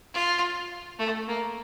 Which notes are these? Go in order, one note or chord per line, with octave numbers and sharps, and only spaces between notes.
F4
A3
A#3